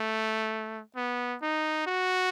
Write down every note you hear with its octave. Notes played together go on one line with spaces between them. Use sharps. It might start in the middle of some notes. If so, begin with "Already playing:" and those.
Already playing: A3
B3
D#4
F#4